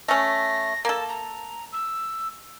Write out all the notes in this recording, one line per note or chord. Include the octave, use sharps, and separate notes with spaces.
A3 C#4 A#6
A#3 A4 A5
A#5
E6